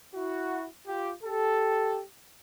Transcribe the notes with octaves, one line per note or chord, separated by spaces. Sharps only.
E4 F#4
F4 G4
G4 A4